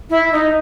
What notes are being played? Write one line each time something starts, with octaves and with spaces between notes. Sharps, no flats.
E4
D#4